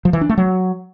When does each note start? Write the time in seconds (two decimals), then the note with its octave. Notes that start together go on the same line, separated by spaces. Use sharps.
0.05 F3
0.13 E3
0.21 D4
0.29 A3
0.38 F#3